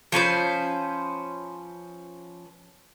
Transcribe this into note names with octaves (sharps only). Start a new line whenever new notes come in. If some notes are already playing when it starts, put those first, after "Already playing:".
F3 C#4 B4 C5